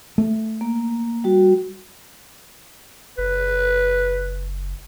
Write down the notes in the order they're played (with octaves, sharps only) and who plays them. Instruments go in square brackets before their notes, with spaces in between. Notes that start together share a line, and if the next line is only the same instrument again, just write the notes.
[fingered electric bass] A3
[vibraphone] A#3
G3 F#4
[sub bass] F#1 [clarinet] B4